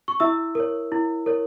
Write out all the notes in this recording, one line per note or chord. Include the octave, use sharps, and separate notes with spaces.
C#6
E4 E5 E6
A#4 C#5
E4
A#4 C#5